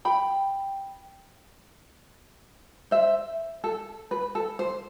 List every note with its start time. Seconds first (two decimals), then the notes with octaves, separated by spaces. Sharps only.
0.05 G5 B5
2.91 C5 E5
3.64 A4
4.11 B4
4.35 A4
4.59 C5